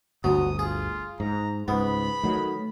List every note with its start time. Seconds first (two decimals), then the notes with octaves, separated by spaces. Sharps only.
0.24 G1 D2 F#3 D#6
0.59 F4 G#4
1.20 G#2 A#5
1.68 C#2 G#2 B3 B5
2.24 D#3 F#3 A3